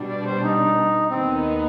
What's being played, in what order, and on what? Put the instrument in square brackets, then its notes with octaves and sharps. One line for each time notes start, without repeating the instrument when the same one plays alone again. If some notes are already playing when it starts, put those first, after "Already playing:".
Already playing: [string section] B2 G3 D4
[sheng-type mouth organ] D5
C5
D#4
[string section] D#2 D#3 B3 D#4 [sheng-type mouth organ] C4